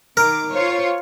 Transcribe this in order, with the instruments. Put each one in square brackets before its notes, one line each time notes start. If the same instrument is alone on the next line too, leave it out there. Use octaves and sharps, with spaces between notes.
[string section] D#3 D6 [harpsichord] A#4
[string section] F4 C5 C#5